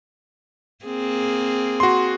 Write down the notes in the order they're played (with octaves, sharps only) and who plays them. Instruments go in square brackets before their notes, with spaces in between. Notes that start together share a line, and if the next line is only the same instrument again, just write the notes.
[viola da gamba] A#3 C4 G#4
[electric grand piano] F#4 C6